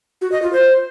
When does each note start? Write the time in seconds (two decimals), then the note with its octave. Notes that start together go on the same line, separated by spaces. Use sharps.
0.21 F#4
0.32 D#5
0.42 F4
0.53 C5